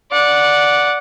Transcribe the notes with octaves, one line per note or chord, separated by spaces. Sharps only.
D5 F#5